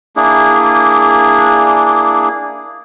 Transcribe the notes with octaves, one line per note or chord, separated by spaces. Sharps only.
A#3 D4 E4 G#4